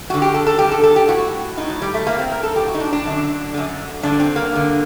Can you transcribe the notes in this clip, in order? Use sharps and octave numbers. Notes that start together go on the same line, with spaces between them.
G2 D3 F#4
G4
A4
A4
G2 D3 G4
A4
A4
G4
A2 F#4
A2 D#4
F#3
G3
A3
A2 A#3
C4
A#4
A4
A2 G4
F#4
D#4
D4
D4
F#2 D3
F#2 D3
G2 D3 D4
C4
A#3
G2 D3